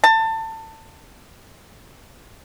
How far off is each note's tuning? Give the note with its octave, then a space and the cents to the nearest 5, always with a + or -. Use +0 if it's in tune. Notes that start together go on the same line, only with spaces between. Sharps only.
A5 +25